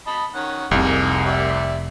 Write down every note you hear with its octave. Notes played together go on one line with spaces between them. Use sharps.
D#5 A5 B5
D#3 C#4 F#5
F1 C2 C3 A#3 D#4 G#4
G4 D5 E5